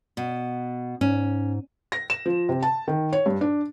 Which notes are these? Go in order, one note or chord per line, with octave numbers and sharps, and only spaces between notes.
B2
G#2 C#4
A#6
E7
F3
C3
A5
D#3
C#5
G2
D4